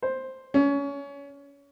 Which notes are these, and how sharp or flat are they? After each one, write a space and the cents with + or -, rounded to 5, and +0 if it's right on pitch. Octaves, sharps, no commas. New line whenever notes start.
C5 +5
C#4 +25